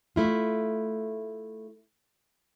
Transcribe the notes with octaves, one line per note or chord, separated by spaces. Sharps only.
A3 E4 F4